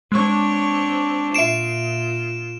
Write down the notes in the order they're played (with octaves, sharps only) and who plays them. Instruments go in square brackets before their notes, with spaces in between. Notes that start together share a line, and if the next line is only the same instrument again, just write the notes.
[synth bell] G#3 C#6 [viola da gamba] C4 D4 C#5
[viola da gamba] A#2 F4 [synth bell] E5 C7 [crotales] D7 E7